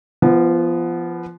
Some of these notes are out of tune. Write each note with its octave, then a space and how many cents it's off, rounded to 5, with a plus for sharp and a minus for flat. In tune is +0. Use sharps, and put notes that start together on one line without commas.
F3 -25 B3 +0